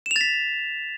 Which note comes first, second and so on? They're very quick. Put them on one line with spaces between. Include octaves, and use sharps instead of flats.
E7 F7 A6 B6